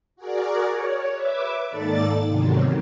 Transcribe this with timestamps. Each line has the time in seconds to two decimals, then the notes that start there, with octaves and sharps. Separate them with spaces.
0.16 F#4 G#4 A#4 D5
0.70 C#5
1.13 B4 E5 D6
1.68 G#2 D#3 A#3 A4 D5 A6
2.26 E2 G#2 C3 D#3 F#3